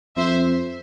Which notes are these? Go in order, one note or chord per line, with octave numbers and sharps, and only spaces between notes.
F2 C5 E5